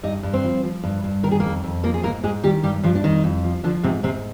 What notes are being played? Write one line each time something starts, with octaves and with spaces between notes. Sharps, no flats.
G2 D#4 D#5
G2
C4 C5
F3
F3
G2
G2
D#3 A#4
G#4
F2 A#3 A#4
F2
F3 A#3 A#4
G#4
G#2 A#3 A#4
G#2 G#3 G#4
D#3 G3 G4
G2 G3 G4
G2 F3 F4
D4
F2 D#3 D#4
F2
F3
D3 F3 D4
G#2 C3 C4
G#2 C3 C4